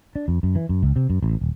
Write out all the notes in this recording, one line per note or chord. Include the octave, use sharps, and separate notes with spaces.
D4
F2
F#2
E3
F#2
C#2
C3
F#2
A1
D#1